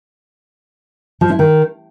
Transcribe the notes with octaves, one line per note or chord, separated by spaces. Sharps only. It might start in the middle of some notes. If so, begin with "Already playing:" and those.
F3
E4
D#3